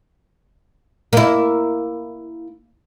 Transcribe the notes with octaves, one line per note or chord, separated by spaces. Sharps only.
A#3 E4